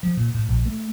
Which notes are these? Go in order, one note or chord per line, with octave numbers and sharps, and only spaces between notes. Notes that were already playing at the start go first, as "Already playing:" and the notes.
F3
A#2
A2
A#1
A3